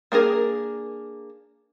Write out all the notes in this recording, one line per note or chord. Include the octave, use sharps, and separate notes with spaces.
A#3 D4 G#4 A#4